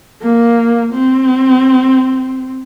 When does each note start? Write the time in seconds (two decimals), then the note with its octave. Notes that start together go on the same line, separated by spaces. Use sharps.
0.22 A#3
0.93 C4